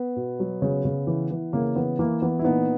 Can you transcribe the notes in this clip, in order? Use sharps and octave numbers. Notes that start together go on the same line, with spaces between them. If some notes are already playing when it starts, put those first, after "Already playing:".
Already playing: B3
B2
F#3
C#3
C#3
E3
E3
C#3 A#3
E3 B3
E3 A#3
E3 B3
E4
A#2 B3 D#4